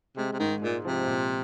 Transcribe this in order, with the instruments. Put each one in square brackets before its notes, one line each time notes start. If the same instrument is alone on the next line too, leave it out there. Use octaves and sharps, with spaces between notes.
[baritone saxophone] C3 [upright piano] G#3
[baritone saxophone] C3
[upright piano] G#2 [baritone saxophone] D#3
[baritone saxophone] A#2 [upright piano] G#3
[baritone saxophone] C3 [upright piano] F3
[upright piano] A#2